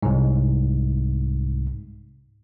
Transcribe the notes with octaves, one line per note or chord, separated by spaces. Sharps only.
C2 G#2